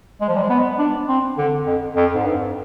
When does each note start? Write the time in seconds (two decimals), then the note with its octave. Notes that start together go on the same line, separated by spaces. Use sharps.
0.21 G#3
0.29 F3
0.36 G3
0.42 G#3
0.50 B3
0.79 D4
1.09 C4
1.38 D3
1.67 F2
1.96 F2
2.15 G#2
2.25 G2